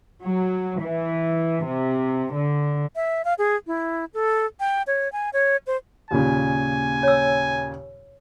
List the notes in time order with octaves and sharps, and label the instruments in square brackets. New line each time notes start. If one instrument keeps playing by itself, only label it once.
[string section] F#3
E3
C3
D3
[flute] E5
F5
G#4
E4
A4
G5
C#5
G#5
C#5
C5
[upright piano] D#2 A#2 C#3 [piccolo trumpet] G#5
[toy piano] C#5 E6